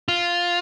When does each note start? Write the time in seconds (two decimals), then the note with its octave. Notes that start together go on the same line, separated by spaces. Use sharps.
0.08 F4